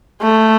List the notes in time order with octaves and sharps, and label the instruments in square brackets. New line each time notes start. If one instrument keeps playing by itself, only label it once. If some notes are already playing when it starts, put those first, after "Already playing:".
[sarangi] A3